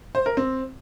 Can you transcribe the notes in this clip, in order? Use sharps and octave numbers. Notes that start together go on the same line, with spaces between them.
C5
A#4
C4